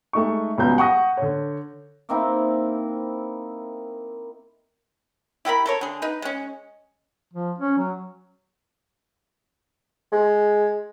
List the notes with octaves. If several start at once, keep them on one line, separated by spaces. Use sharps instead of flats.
G#3 A3 D#4 C#6
C#2 F#3 G3 B3 A#5 G6
F#5 C#6 D#6 A#6
D3 C#5
A#3 C4 D#4 E4
E4 G4 A#4 B5
A4 A#4 C#5
D3 G#4
D#4 B4
G#3 C#4
F3
C#4
F#3
G#3